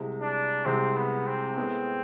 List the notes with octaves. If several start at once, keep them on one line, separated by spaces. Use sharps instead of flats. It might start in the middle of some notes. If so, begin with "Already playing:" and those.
Already playing: C2 C3 G#3
D4
C2 C3 G#3 C4
B3
C4
A2 G#3 B3